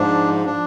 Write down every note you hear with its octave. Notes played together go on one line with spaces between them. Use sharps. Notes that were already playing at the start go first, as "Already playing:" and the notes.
Already playing: G#2 F3 D4
F3 D4